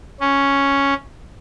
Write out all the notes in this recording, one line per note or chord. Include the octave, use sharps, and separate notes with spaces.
C#4